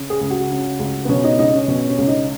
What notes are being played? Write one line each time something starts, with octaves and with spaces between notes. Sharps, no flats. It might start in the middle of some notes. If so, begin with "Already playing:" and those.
Already playing: C#3
G#4
C#2
F#4
C#3
C#2
B3
B2 C#4
D#4
C#2 D#4
C#4
B2 C#4
C#4
C#2
D#4